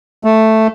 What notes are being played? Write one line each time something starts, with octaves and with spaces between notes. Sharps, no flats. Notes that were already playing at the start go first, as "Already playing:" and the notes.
A3